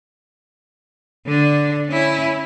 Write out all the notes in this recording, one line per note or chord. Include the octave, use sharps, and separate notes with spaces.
D3 D4
C#4 E4